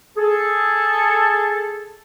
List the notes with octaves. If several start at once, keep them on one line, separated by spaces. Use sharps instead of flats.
G#4 A4